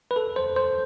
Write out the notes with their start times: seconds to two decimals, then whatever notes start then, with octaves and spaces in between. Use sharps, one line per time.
0.11 B4
0.16 A4
0.36 C5
0.56 C5